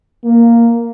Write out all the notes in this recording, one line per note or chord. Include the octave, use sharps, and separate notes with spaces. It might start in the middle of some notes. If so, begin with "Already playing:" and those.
A#3